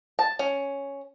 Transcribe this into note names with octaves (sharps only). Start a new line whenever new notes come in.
A5
C#4